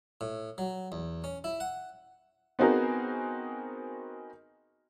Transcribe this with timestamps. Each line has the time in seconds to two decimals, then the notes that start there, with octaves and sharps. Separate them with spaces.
0.21 A2
0.58 F#3
0.92 E2
1.24 C#4
1.44 E4
1.60 F#5
2.59 B3 C4 D#4 F#4 G#4 A#4